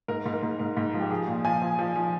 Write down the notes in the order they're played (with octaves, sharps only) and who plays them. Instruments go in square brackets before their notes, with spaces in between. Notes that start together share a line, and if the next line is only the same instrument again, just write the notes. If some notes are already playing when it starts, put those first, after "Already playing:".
[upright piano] G#2 A#4
G#2
A#4
G#2
G#2 A#4
G#2
F3
G4
F3 G#4
A#2
F3 G#5
F3
F3
F3